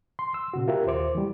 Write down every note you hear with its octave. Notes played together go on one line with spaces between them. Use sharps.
C6
E6
A#2 C#3 F#4
F4 G4 A#4 E5
D#2 C5 D6
E3 G3